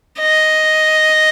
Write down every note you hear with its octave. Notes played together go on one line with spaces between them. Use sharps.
D#5